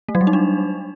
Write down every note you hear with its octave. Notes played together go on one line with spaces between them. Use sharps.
A3
F#3
G3
D#4
D4